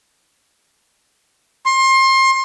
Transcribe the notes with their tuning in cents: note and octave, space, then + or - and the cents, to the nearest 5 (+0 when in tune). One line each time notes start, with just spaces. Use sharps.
C6 +30